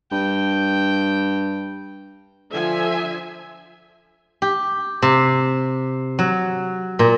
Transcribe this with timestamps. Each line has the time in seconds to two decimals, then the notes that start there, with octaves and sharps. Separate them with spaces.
0.12 G2 G5
2.50 D3 F3 E5 G#5
4.42 G4
5.02 C3
6.19 F#3
6.99 A#2